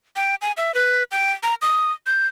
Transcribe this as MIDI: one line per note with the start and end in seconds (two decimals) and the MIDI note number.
0.16 0.35 79
0.42 0.52 80
0.57 0.74 76
0.74 1.03 71
1.11 1.32 79
1.43 1.55 82
1.62 1.92 87
2.07 2.27 91